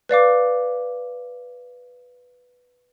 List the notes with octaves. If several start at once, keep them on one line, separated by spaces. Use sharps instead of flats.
B4 D5 F5 D6